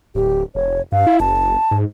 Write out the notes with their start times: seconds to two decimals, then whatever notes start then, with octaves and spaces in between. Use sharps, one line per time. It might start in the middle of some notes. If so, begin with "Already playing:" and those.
0.15 D1 G4
0.55 F1 C#5
0.92 G2 F5
1.07 E4
1.20 F#1 A5
1.71 G#2